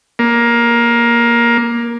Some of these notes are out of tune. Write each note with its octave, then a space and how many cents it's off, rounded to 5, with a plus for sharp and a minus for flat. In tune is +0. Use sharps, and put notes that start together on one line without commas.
A#3 +15